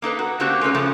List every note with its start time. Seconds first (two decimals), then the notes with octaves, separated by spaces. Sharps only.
0.02 A#3 D#4 A4 B4
0.19 F#4
0.40 D3 A3 A#3 C4 F#4 G4
0.61 G#3 A3 C#4 B4
0.75 C#3 F3 A3